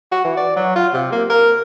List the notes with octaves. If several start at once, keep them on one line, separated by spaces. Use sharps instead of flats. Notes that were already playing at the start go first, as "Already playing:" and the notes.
F#4
E3
D5
F#3
F4
C3
A#3
A#4